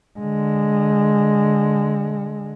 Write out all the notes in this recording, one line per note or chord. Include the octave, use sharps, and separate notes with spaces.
D3 G#3